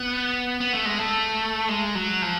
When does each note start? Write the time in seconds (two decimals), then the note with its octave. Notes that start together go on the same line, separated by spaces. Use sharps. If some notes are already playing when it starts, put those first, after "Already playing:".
Already playing: B3
0.60 B3
0.73 A3
0.85 G#3
0.98 A3
1.69 G#3
1.95 F#3
2.22 F3